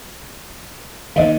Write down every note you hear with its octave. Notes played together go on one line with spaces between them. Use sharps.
D#2 D#3 C5 D#5 F5